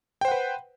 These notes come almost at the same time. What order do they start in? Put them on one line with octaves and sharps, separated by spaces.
G5 C5 F#5 B4